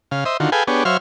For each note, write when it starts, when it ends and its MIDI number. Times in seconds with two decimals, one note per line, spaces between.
0.11 0.24 49
0.11 0.24 77
0.25 0.37 72
0.25 0.37 75
0.25 0.37 76
0.40 0.50 50
0.40 0.50 51
0.40 0.50 65
0.40 0.50 66
0.52 0.64 68
0.52 0.64 69
0.52 0.64 71
0.52 0.64 77
0.52 0.64 79
0.52 0.64 80
0.67 0.84 59
0.67 0.84 62
0.67 0.84 67
0.67 0.84 68
0.67 0.84 73
0.85 0.97 54
0.85 0.97 72
0.85 0.97 73
0.85 0.97 76
0.85 0.97 77
0.85 0.97 89